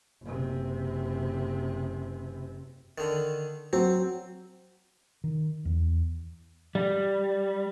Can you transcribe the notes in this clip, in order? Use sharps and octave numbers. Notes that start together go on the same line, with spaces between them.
F#1 C3
D3 D#3
F#3 C4
D#3
E2
G3